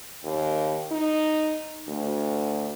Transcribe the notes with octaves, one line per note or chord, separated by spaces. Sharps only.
D#2
D#4
D2